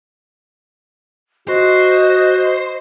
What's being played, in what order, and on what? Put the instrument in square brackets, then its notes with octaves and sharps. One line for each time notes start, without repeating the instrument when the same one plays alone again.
[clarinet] F#4 [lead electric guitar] C5 [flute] D#5